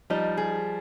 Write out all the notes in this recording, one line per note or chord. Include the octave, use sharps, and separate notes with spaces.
F3 G3 D#4
G#4